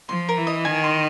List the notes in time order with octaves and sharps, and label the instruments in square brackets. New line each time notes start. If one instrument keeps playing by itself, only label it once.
[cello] F3 [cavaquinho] C6
[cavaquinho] A#4
[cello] E3
[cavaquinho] D#5
[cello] D#3 [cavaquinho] G#5
[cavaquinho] C6